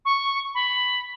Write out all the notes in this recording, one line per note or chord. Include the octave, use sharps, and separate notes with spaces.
C#6
B5